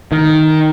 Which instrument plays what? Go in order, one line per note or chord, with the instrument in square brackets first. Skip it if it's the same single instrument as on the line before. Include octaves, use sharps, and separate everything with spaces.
[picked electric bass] D#3